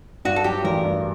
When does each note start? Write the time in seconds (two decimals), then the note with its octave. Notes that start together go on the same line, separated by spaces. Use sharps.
0.25 G2 F#4
0.36 A4
0.44 F#3 G4
0.64 A1 A#4
0.84 G2